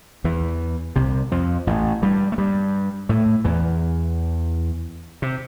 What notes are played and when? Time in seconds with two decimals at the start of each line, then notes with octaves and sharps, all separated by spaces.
0.24 E2 E3
0.96 C2 C3
1.31 F2 F3
1.67 A1 A2
2.02 G2 G3
2.32 A3
2.38 G2 G3
3.09 A2 A3
3.45 E2 E3
5.22 C3